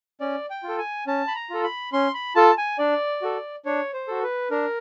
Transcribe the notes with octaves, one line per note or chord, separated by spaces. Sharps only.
C#4 D5
G5
F4
A4
G#5
C#4 A5
B5
A#5
F4 A4
B5
C#4 C6
B5
F4 A4 A5
G#5
D4 D5
F#4 A4
D4 C#5
C5
F#4 A4
B4
D4 A#4